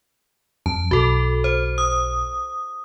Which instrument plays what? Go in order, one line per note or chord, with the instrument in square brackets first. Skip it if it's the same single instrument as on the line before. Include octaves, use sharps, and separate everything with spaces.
[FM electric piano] F2 [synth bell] A5
[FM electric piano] B1 [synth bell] F#4 A4
[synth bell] C5
D#6